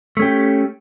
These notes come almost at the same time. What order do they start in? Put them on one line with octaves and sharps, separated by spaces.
A3 C#4 G4